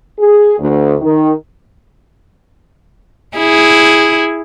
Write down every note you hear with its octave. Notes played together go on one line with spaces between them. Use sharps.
G#4
D2
D#3
E4 G#4